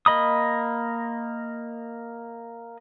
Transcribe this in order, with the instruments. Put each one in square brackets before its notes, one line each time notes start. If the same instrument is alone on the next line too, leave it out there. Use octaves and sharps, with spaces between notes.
[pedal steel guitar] A#3 D#5 B5 D#6